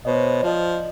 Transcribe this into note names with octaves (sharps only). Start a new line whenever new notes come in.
B2 C5 C#5 D#5
F3 D5 D#5